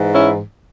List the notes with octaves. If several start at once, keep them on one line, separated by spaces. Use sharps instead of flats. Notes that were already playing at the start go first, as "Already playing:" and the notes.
Already playing: G#2 E3
C#4 E4